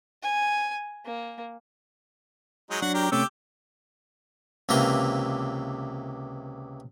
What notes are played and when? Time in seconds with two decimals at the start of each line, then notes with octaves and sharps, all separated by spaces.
0.23 G#5
1.05 A#3
2.70 F#3 G#3 D#4
2.82 F#3 D4 F#4 F#5
2.94 G4 A#4
3.12 C3 A3 C#4 G4 D6 E6
4.69 C#2 C3 E3 A#3 A#5 C6